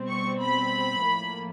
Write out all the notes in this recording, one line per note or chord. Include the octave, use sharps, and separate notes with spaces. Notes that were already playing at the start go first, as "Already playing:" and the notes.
Already playing: B2 G3 C4
C#6
B5
A2 F3 A#3